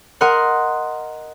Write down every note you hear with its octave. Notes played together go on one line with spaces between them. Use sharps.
A#4 D#5 F#5 C6 F#6